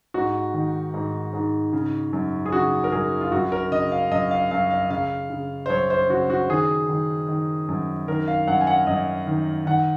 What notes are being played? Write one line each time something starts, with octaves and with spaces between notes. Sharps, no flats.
G#2 F#4
D#3
G#2
G#2
C#3
F#2
G#4
C#3 F#4
A#4
F#2 G#4
F4
F#2 F#4
A#4
C#3 D#5
F5
F#2 D#5
F5
F#2 F5
F5
C#3 F5
C#3
C5
F#2 C#5
C5
C#3 F#4
F#4
D#3 G#4
D#3
D#3
F#2
D#3 A#4
F5
F#2 F#5
G#5
F#5
F#2 D#5
D#3
D#3 F#5